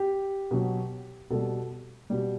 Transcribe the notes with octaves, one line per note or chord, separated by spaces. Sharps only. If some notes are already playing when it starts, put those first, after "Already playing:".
Already playing: G4
B2 F#3
B2 G3 A4
B2 G3